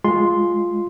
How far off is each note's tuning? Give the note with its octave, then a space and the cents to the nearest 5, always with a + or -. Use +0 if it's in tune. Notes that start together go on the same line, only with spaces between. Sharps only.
G#3 +0 F4 +0 C6 +0